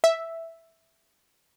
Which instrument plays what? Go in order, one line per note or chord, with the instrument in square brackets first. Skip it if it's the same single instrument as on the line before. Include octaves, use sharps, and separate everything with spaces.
[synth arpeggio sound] E5